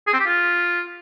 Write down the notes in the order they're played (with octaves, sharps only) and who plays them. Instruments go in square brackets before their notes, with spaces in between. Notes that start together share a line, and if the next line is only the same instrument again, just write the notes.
[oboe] G#4
C4
G4
F4